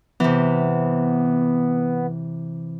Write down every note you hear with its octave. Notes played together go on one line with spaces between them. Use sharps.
C3 E3 B3